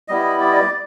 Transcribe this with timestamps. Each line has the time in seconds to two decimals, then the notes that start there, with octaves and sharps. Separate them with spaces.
0.08 G3 B3 E4 D#5
0.40 D5
0.52 D#5
0.56 D5